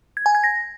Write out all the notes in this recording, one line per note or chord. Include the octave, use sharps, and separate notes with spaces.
G#6
G#5
G#6
A#6